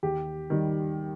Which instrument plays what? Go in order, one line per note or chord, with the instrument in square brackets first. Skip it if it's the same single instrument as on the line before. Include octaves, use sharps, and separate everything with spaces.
[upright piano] D#2 G4
D#3 G3